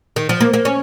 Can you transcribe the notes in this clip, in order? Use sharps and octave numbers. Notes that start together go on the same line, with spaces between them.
D#3
F3
A#3
A#3
C#4